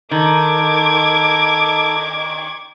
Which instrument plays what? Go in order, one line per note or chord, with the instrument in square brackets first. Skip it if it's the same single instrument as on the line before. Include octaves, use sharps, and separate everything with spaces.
[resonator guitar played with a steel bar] D#3 [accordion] D#4 A4 [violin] D6 G#6